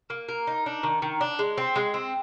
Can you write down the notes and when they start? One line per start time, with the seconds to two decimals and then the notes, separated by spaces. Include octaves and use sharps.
0.10 A#3
0.29 A#4
0.47 D#4
0.66 D4
0.83 D#3
1.02 D#3
1.21 D4
1.39 G#3
1.58 C4
1.76 G#3
1.94 C4